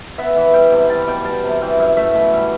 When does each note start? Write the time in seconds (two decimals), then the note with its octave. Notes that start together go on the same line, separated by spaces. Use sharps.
0.18 B3 E5
0.36 E3
0.53 G3 G5
0.72 C3
0.89 G3 A5
1.08 B2 G5
1.25 G3 A5
1.44 C3
1.61 E3 G5
1.79 F#2
1.97 A3 E5
2.15 B2
2.33 G3